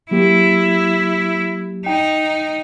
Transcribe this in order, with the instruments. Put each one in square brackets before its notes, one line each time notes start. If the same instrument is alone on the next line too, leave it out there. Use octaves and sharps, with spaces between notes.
[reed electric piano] F#3 A#3 G4 [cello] E4
[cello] D#4 [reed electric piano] G5